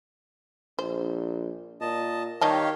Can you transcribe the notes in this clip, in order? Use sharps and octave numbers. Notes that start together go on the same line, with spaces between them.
A#1 C5
A#2 D#5 A5
D#3 G3 D#4 G4 C#5 F5 A5